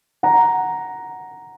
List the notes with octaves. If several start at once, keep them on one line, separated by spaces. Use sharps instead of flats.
F#5 A#5